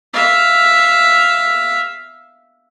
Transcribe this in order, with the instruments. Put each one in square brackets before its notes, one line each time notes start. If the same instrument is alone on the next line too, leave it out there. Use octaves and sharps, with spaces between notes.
[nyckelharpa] E5 F5